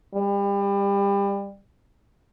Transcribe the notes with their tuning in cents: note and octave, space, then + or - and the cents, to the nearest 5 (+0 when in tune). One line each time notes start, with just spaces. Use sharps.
G3 +30